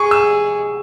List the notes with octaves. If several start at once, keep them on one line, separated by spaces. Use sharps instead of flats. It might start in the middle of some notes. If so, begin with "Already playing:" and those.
Already playing: G#4 C#6
E6